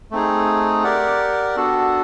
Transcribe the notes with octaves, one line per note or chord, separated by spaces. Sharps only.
A3 C4 D#4 G#4
G4 A#4 D5 F#5
B3 D4 F#4 A4